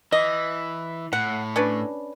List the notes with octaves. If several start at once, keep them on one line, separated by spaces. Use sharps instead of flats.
E3 D#5
A2 F#5
C#4 D4 B4